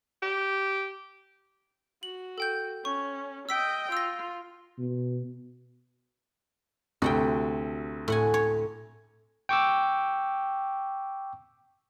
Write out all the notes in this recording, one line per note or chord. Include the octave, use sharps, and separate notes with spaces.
G4
F#4 F#7
A4 G5 G6
C#4 C#6
D#5 G5 E6 B6 D7
F4 E6 A#6
B2
D2 C3 A3 F#4 F#5 G5
A2 F#5 G#5
C#5
G5 C#6 D6 E6